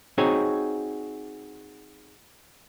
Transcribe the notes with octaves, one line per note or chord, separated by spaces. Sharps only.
C4 D#4 F#4 G#4 C#5